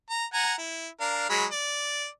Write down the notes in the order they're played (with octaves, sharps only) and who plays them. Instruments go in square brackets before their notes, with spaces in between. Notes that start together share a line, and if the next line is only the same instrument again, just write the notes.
[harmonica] A#5
F#5 G#5 A#5
E4
D4 A#4 F5
F#3 G#3 B5
D5